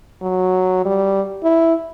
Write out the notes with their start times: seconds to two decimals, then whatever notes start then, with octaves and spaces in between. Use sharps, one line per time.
0.22 F#3
0.85 G3
1.44 E4